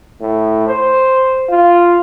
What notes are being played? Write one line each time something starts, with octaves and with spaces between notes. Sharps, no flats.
A2
C5
F4